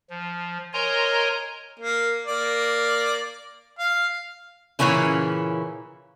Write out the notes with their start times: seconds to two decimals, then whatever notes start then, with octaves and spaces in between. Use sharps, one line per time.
0.10 F3
0.73 A#4 C#5 D#5 G#5 A#5 C6
1.79 A#3
2.26 A#3 D5
3.78 F5
4.79 A#2 C#3 E3 A#3 C#4 E4